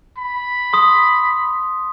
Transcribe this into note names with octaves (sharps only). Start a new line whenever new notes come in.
B5
C6 D#6 B6